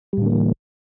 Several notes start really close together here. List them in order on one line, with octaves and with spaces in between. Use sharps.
G3 A2 D3 A#3 E3